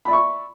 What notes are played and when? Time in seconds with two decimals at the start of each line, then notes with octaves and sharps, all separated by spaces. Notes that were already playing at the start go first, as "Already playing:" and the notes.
0.05 B5
0.08 D5
0.10 E5
0.13 C#6